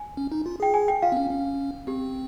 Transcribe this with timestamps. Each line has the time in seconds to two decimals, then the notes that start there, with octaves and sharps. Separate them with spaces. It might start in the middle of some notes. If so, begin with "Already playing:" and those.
Already playing: G#5
0.17 C#4
0.32 D#4
0.46 F4
0.60 G#4 G5
0.74 G#5
0.88 G5
1.02 F4 F5
1.12 C4
1.17 C#4
1.31 C#4
1.87 C4 G4